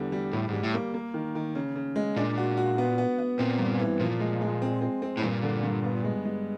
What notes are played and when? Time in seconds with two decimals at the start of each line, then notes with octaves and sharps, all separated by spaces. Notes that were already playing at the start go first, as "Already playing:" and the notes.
Already playing: E2 D3 G3
0.12 G3
0.33 A2 G3
0.49 G#2 G3
0.64 A2
0.74 A#3
0.94 A#3
1.14 D#3
1.35 D#3
1.55 C#3
1.76 C#3
1.96 G#3
2.16 A#2 D4
2.38 F#4
2.57 F#4
2.78 B3
2.98 B3
3.19 B3
3.39 A#2 C4
3.59 G2
3.79 E3
4.00 A#2 F3
4.20 G#3
4.41 G#3
4.62 C4
4.82 C4
5.02 C4
5.17 A2
5.23 G2 A#2
5.43 D3
5.63 G2
5.84 B3
6.04 G#3
6.25 G#3